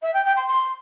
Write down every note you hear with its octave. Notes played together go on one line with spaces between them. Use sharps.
E5
G5
G5
C6
C6